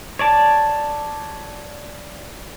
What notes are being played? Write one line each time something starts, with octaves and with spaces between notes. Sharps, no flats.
C#5 D5 A5